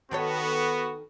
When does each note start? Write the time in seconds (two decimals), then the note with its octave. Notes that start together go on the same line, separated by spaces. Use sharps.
0.11 D#3 B3 F#4 A4 C#5